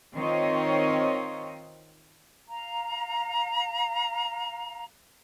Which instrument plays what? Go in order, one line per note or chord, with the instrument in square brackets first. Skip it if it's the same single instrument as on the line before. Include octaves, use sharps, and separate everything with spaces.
[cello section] D#3 C4 D#4 F4 C#5 D#5
[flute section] F5 A#5